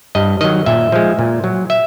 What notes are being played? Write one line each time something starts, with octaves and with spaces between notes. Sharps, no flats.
G2 D#5
D#3 F#3 D#5
A#2 E5
F3 G#3
A#2
F#3
E5